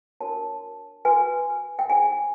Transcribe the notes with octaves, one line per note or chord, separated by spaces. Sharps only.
D4 F#4 A#4 C#5 A5
F#4 B4 G#5
G5
D#4 G#4 C5 G#5